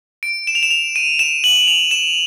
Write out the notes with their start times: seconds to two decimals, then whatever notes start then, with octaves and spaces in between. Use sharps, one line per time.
0.23 D7
0.47 E7
0.55 F7
0.63 E7
0.71 F7
0.96 D#7
1.19 E7
1.44 F#7
1.68 F7
1.91 E7